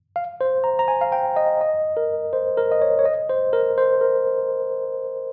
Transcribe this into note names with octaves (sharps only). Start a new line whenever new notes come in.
F5
C5
A#5
A#5
G#5
F5
G5
D#5
D#5
A#4
C5
A#4
D#5
C#5
C#5
D#5
C5
A#4
C5
A#4